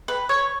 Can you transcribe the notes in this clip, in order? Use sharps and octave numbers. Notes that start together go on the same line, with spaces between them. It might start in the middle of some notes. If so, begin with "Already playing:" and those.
B4
C#5